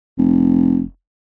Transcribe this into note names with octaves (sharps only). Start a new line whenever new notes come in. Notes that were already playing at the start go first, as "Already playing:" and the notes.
F1